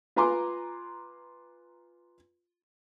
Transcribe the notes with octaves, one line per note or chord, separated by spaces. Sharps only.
F4 B4 G#5 A#5 C6 D6